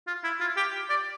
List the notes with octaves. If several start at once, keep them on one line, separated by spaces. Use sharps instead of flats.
F4
E4
F4
G4
D5